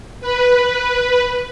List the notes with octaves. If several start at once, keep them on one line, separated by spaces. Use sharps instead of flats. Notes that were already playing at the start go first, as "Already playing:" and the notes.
B4